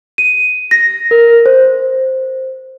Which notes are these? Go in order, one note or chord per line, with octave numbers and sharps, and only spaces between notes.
D#7
A#6
A#4
C5